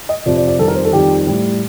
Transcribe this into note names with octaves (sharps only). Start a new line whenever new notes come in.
D#5
F2 C3 F3 D5
D5
D5
F2 D#3 G3 A4
A#4
C5
A4
F2 D#3 G3 G4
A2 G3